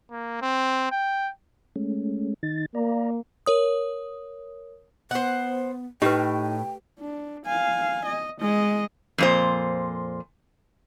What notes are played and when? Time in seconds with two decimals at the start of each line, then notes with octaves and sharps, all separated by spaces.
0.11 A#3
0.41 C4
0.91 G5
1.76 G#3 A3 C#4
2.43 D#3 D#4 A6
2.75 A#3 D5 A#5
3.46 A#4 C#5 D#6
5.11 B3 C5 F#5
6.02 A2 D#4 G4 B4 G5
7.00 D4
7.46 F5 G#5
8.06 D#5
8.41 G#3 D#5
9.18 F2 A#2 C5